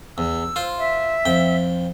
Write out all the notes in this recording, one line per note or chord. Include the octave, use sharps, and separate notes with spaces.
E2 E6
F4 C5
E5
F2 G5